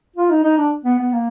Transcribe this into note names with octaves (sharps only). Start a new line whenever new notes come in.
F4
D#4
D#4
D4
B3
B3
A#3